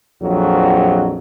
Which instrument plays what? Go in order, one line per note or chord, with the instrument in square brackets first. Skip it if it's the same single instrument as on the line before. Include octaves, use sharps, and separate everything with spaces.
[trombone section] A#1 F2 F#3